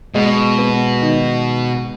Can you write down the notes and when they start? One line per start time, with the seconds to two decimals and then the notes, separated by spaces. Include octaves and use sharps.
0.14 B2 G#3
0.58 B3
1.02 D#3